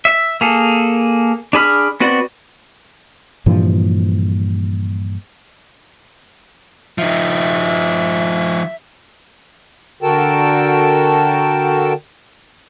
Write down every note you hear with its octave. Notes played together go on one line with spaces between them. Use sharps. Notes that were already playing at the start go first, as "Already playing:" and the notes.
E5
A#3 G#4 A4
D4 G#4 B5 F6
B3 C4 F#4 B4 D5
G2 A#2 E3 F3
F3 D#4 E5
D3 F#4 A4 A#4 G5 A5